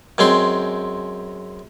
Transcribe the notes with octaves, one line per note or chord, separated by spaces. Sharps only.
F#2 G#3 C4 C6